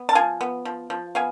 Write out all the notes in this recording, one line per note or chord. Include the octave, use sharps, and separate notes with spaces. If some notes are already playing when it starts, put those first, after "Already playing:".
Already playing: B3
A5
F3 F5 G#5
B3
F3
F3
B3 F5 G#5